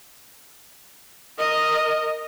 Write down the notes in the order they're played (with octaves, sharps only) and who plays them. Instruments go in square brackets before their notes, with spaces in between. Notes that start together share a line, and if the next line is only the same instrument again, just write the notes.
[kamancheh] A#4 D#5